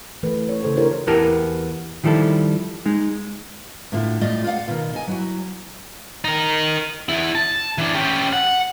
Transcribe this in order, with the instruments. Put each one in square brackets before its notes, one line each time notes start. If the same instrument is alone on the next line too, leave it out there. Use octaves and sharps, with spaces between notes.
[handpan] E3 A3 A4 B4
C#5
C#3 A4 C5
D4 E4 G4 A#4 C5 C#5
[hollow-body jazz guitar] E2 B3 E4 G4 A#4 A5
D#3 F3 G3 E4 A4
G#3 D#4
[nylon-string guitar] A2 D3 E4 F4
A2 A3 F4 D5 D#5
F4 D5 F5 F#5
B2 D#3
D#5 G#5
F#3 E4 F#4
[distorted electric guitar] D#4 A#4
E2 E4
A5
E3 D4
C#4 G4
F#5